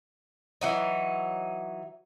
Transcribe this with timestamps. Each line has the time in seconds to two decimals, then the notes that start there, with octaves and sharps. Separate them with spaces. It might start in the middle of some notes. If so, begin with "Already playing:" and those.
0.61 E3 F#3 D#4